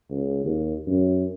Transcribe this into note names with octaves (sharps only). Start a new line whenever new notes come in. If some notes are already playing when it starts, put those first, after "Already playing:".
C#2
D#2
F#2